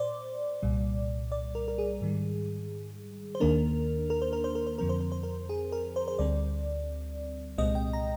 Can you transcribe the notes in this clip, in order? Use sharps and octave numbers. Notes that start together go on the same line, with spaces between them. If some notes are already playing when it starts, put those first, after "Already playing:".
Already playing: A#2 C5 D5
C2 A#2 G3
D5
A#4
A#4
G#4
G#2 D#3 G3
C5
D#2 D#3 A#3 D4 A#4
A#4
C5
A#4
C5
A#4
C5
F2 D3 F3 C4 A#4
C5
A#4
C5
A#4
G#4
A#4
C5
C5
D2 D3 G3 C4 D5
C2 A#2 G#3 C4 D#5
G5
A#5